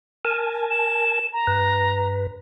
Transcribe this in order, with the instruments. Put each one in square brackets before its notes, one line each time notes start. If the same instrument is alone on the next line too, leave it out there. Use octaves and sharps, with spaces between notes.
[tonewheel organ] A#4 G#5 A5
[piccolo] E7
A#5
[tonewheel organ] G2 B4